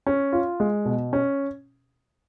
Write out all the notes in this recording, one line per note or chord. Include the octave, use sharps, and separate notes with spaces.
C#4
F4
G#3
B2
C#4